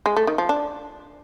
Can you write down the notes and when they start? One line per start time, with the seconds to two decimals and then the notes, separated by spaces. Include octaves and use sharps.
0.06 G#3
0.17 A3
0.27 D#3
0.38 F3
0.49 D4